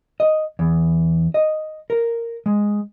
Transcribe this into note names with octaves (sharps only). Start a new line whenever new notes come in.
D#5
E2
D#5
A#4
G#3